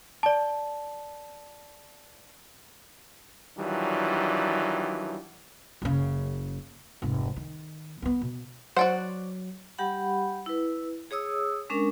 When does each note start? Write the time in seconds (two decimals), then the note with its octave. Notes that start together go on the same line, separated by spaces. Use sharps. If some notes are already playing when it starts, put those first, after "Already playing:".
0.23 D5 A5
3.58 D#3 E3 F#3 G3 D4 F4
5.82 F#1 C#3
7.02 F1 G#2
7.36 D#3
8.02 B3 C4
8.21 B2
8.77 F#3 F#4 C5 D5 F#5
9.78 G3 G4 F#5 B5
10.46 E4 B4
11.11 G#4 C#5 D#6 E6
11.70 G#3 C#4 D4 A#4